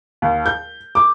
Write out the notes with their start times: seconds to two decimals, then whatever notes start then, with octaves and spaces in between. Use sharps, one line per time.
0.22 D#2
0.46 G6
0.95 D6